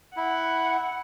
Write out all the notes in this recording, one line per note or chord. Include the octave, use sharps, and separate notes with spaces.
E4 F#5